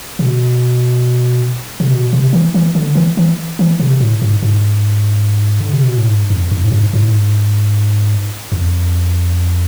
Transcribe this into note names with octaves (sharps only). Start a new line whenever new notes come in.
C3
B2
C3
B2
C3
E3
E3
D3
E3
E3
E3
C3
A2
G#2
G#2
D3
C3
B2
A2
G#2
F2
F2
A2
G#2
G#2
A2
G#2
E2
F2